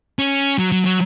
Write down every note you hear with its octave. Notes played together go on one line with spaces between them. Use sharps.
C#4
F#3
F#3
F#3